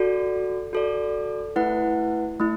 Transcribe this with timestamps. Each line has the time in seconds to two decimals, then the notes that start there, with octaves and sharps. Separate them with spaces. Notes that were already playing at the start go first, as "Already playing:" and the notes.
Already playing: F#4 A4 D5
0.73 F#4 A4 D5
1.56 A3 E4 B4 F#5
2.40 A3 E4